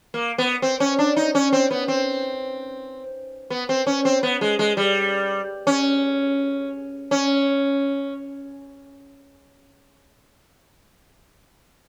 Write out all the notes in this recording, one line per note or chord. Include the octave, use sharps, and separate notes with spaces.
A#3
B3
C4
C#4
D4
D#4
C#4
C4
B3
C4
B3
C4
C#4
C4
B3
G#3
G#3
G3
C#4
C#4